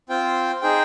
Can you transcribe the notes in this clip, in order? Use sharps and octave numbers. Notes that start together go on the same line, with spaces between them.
C4 F4 C5 G5
D#4 G#4 C5 G5